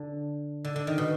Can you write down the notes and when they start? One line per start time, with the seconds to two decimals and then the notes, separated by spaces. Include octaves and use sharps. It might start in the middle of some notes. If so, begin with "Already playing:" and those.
Already playing: D3
0.65 D3
0.76 D3
0.87 D#3
0.98 B2